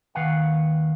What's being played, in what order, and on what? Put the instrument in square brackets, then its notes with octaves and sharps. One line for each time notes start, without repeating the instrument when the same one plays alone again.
[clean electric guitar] D#2 D#3 B4 F5 F#5